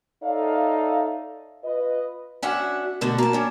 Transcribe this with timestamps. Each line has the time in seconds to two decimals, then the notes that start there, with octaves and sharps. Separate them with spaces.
0.24 D#4 A4 C#5 D5 E5 F5
1.65 F4 B4 D#5
2.42 C#4 D4 F#4 E5 F#5
3.01 B2 D3 A3 F#4
3.18 A#3 A5
3.33 C#4 D4